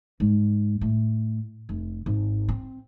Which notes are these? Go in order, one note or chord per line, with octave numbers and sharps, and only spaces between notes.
G#2
A2
F1
G#1
C4